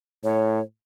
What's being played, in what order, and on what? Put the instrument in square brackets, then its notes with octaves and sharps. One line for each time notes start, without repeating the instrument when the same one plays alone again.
[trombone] A2 [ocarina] C#5